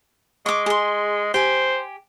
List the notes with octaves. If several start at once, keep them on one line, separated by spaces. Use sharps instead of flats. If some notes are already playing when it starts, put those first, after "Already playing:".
G#3 C#6 D6
G#4 C6
G4 C5 G#5